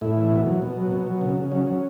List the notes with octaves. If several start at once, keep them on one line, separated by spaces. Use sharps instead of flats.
A2 E4
E3
B2
F#3
B2
F#3
B2
F#3
C#3
C#3
F#3 C#4
F#3 C#4